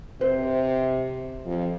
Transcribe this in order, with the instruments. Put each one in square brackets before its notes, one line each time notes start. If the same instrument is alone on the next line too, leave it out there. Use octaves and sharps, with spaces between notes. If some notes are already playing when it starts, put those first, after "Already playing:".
[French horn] C3 [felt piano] C5
[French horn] F2